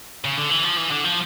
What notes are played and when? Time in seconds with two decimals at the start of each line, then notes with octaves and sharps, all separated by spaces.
0.25 C#3
0.38 D3
0.51 E3
0.64 F3
0.78 E3
0.91 D3
1.05 F3